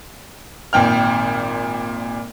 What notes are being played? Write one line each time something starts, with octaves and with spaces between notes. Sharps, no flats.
G#1 A#2 G5 F6